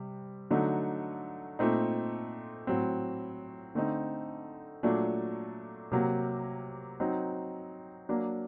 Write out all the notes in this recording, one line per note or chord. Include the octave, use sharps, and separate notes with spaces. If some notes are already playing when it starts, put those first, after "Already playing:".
Already playing: C3 G3
D3 F#3 A3 D#4
A#2 A3 C4 D#4
A2 F#3 C4
D3 A3 C4 D#4
A#2 F#3 A3 D4
C3 F#3 A#3
F#3 C4 D#4
F#3 A#3 D4